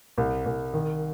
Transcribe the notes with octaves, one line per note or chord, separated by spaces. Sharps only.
C2
C2
D#3